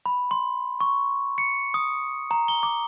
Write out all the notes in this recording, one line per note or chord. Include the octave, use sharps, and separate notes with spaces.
B5
C6
C#6
C#7
D#6
A#5
G7
D6